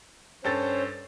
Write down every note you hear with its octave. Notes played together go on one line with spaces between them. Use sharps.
G2 C#4 A4 C5 C#5 A6